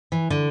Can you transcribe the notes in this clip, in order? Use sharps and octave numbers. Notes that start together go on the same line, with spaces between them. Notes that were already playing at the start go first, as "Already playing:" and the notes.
E3
D3